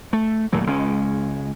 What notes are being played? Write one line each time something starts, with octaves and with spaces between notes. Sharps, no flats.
A3
D#2 A#2 F#3 A3
C#2 G#3 C#4